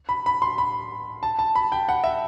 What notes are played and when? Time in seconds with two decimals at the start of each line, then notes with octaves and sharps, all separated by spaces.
0.09 B5
0.26 B5
0.42 C6
0.58 B5
1.23 A5
1.39 A5
1.55 B5
1.72 G5
1.89 F#5
2.04 E5